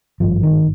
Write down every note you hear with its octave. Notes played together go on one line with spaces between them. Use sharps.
G#1 G2 F3
D#3